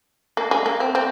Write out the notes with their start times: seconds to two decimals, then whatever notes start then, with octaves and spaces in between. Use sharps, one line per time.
0.37 A#3
0.51 G#3
0.66 A#3
0.80 C4
0.95 C4